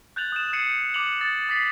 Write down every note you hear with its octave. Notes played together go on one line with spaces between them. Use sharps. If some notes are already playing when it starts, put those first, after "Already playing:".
F#6 G6 A6 F7 F#7
D#6 E7
G6 G#6 C7 C#7 D#7
D6 C#7 D#7 F7 F#7
D#6 A6
D#6 A6 B6 C7 E7